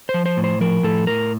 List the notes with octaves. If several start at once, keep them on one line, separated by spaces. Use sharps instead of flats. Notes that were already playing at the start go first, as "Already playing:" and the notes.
C5
F3
C5
A2
C5
F3 A#4
A2 A4
A2 A#4